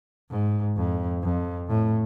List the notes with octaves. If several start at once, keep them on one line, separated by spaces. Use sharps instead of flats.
G#2
F2
F2
A2